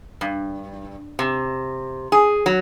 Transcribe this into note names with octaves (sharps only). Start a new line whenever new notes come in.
G2
C3
G#4
F#3